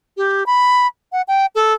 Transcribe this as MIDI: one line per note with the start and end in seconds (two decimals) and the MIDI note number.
0.17 0.46 67
0.46 0.87 83
1.12 1.22 78
1.28 1.46 79
1.55 1.73 69